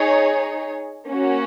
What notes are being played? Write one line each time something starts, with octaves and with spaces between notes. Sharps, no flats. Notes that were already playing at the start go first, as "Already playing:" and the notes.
Already playing: D#4 G#4 C#5
A#3 C#4 F#4 C#5